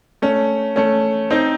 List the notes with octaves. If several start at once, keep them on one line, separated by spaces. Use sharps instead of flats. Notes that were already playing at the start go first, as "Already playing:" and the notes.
A3 C#4
A3 C#4
C4 D#4